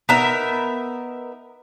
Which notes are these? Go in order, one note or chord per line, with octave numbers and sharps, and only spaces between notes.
B3 D#4 A#4 E5